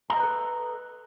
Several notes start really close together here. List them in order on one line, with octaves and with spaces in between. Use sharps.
A#5 D#5 C5 B4 A4